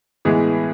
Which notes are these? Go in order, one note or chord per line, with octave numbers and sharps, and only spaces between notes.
A2 E3 G#3 B3 G#4